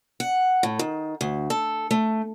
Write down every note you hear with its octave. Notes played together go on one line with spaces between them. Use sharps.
F#5
A2
D#3
D2
A4
A3